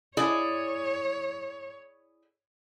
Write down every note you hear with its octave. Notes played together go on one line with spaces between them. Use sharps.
E4 G#4 C#5 D5